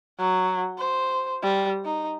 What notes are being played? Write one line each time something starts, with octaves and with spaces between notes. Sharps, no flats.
F#3
C5
G3
D#4